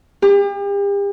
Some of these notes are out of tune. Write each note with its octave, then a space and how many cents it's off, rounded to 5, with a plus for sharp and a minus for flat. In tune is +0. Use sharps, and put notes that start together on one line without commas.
G4 +40